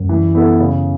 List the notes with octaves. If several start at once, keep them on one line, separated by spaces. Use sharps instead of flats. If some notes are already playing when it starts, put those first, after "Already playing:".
Already playing: F#2
E3
B3 E4 A4
C#3